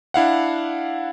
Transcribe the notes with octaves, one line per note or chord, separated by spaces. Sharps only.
D4 E4 F5 F#5